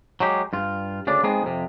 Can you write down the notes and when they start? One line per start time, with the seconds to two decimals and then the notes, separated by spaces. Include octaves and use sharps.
0.20 F#3 G#3 G4
0.53 G2 F4
1.07 D2 C#3 D4 D5
1.23 G#3 B3 C4 D#4 G#4
1.43 F2 C3